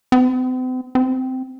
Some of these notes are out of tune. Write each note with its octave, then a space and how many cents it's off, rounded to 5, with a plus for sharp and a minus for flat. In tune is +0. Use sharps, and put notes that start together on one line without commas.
C4 -45
C4 -15